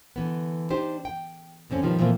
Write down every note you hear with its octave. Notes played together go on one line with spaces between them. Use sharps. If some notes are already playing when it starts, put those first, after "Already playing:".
D3 E3 B3
D4 D#4 G4 C5
G5
F2 D3 C4 C#4
B2 D#3 F3 G3
A#2 E3 F3 A3 A#3 C4